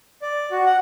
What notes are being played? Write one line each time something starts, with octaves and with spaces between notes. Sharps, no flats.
D5
F#4
F#5